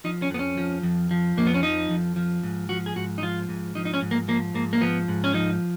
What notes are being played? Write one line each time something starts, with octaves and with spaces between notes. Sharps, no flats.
F3 D#4
C#4
F2 B3
C#4
F3
F2
F3
F2 A#3
B3
C#4
F3 D#4
F2
F3
G#2
F3 F#4
G#4
G#2 F#4
D#4
F3 F4
G#2
F3 D#4
D#4
C#4
G#2
A#3
F3 A#3
G#2 A#3
A#3
F3 B3
G#2
C#4
F3 D#4